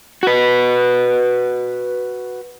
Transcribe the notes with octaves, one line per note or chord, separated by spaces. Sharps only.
F#4 B4